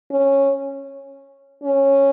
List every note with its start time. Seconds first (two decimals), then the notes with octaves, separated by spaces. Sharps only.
0.11 C#4
1.64 C#4